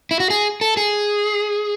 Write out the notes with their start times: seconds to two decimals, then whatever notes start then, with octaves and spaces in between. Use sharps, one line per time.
0.11 E4
0.20 F#4
0.30 G#4
0.61 A4
0.77 G#4